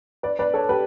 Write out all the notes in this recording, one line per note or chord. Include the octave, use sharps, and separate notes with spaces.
B4 D5
B4 D5
A4 C#5
G4 B4